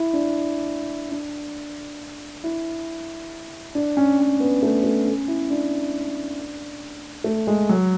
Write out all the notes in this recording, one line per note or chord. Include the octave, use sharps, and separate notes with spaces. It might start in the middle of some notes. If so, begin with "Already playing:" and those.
Already playing: E4
D4
D4
E4
D4
C#4
C#4
B3
A3
A3
C#4
E4
D4
A3
G#3
F#3